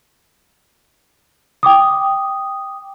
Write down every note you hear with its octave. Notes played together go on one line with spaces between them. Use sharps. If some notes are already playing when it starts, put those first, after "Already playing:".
G5 D6 D#6